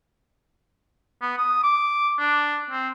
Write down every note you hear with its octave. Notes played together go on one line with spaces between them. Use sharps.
B3
D#6
D6
D4
C4